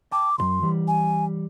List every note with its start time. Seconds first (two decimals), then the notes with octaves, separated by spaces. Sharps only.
0.12 G5 A5 D6
0.38 C2 F#2 F#3 C6
0.62 E3 G3
0.88 G#5